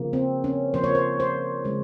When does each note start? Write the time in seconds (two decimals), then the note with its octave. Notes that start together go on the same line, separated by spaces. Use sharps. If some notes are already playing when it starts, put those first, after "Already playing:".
Already playing: C#3 F3 A#3
0.13 C4
0.44 C#4
0.74 C#3 F3 A#3 C5
0.84 C#5
0.95 C5
1.20 C5
1.64 C#3 G#3